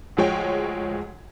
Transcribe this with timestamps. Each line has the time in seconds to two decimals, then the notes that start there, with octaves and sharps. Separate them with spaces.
0.17 D2 F3 G#3 C#5 G5